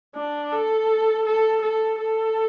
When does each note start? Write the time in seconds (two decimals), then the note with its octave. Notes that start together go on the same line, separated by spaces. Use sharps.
0.16 D4
0.53 A4
1.26 A4
1.62 A4
1.99 A4